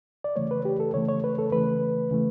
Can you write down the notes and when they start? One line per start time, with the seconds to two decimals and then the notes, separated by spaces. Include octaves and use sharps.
0.24 D5
0.36 C#3 E3 A3 C#5
0.51 B4
0.65 G4
0.80 A4
0.94 C#3 E3 A3 C#5
1.09 C#5
1.24 B4
1.39 A4
1.52 C#3 E3 A3 B4
2.11 C#3 E3 A3